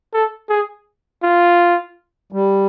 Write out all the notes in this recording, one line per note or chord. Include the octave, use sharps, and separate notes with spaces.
A4
G#4
F4
G3